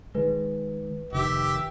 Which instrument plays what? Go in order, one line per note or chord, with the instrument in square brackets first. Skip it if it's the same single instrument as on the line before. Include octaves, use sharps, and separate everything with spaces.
[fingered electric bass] D#3 G#3 [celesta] B4
[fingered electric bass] F1 D#3 [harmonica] G4 E5